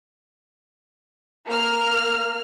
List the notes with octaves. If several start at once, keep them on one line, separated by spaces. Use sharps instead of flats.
A#3 F6